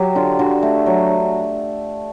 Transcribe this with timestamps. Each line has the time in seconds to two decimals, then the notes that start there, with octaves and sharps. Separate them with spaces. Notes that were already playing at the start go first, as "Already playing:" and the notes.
Already playing: F#3 G4
0.15 D3 F4
0.39 D3 F#4
0.63 A3
0.86 F#3